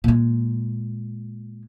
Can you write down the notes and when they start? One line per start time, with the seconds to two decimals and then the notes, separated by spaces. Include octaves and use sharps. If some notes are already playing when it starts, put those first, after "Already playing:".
0.04 A#2 G#3